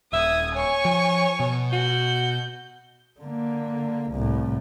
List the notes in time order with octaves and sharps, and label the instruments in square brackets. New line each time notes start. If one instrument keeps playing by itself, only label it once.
[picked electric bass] D#1 [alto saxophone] E5 [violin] D#6 G#6
[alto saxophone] C#5 [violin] G#5 C#6
[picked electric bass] F3
B2
[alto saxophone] F#4 [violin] G6
[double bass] D3 A#3
C2 A2